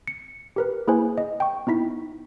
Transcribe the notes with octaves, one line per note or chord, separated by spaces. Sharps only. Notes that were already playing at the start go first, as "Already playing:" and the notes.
C#7
G4 A#4 B4
A#3 E4 G#4 B4 C5 G#5
D#5
G5 C#6
B3 D#4 E4 B6